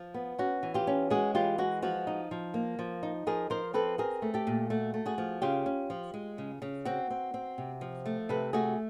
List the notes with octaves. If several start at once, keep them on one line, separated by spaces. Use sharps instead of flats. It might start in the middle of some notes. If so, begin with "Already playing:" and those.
Already playing: F3
B3
C#4 F#4
E3
F4 G4
C#4
G#3 F#4 G#4
E3 F4 G4
G#3 F#4
F3 F#4
D#4
F3
A#3
F3
D#4
F3 G#4 A#4
F3 A#4 C5
C4 A4 B4
C4 G#4 A#4
A3
G4 A4
A#2
A3 F#4
A3
F#4 G#4
F3
C#3 F4 G4
C#4
F3
G#3
C#3
C#3
C4 F#4
C4
C4
C3
F3
A3
C3 A4 B4
A3 F#4 G#4